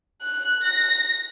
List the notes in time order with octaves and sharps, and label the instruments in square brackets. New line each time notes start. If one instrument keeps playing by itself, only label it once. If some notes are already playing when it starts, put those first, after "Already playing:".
[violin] F#6
A#6